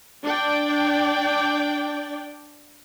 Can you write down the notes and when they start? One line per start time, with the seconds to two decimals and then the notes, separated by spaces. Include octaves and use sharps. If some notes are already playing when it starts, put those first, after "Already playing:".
0.24 D4 D5 G5